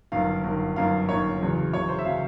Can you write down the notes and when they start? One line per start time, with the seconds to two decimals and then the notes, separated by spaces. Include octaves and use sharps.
0.12 G1 F#2 D#3 F5
0.44 G1 F#2 D#3
0.76 G1 F#2 D#3 F5
1.09 G1 F#2 D#3 C#5
1.40 E2 C#3 F#3
1.73 E2 C#3 F#3 C#5
1.88 C5
1.99 E5
2.05 C#3 F#3 F5